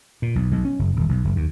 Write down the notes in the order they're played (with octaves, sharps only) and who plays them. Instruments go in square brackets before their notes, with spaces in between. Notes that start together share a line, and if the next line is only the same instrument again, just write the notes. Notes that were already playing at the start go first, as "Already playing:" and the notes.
[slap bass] A#2
B1
B1
C#4
F#1
D#1
B1
F#1
D#2